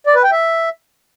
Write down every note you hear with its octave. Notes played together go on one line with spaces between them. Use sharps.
D5
B4
G5
E5